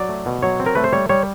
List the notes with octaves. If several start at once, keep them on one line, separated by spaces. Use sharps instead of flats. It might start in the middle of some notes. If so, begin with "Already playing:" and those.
Already playing: F#3 D5
A3
B2
F#3 C#5
C4
A#4
A3 B4
C5
G3 C#5
G3 C#5